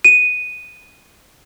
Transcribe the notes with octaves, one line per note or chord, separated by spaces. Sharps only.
D#7